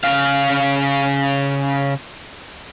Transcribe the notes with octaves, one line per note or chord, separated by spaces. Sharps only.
C#3 F5